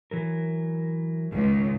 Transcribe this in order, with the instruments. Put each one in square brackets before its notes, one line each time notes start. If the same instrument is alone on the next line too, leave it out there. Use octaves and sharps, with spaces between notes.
[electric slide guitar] E3 F#3 A#4
[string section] C#2 [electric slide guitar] G#2 D#3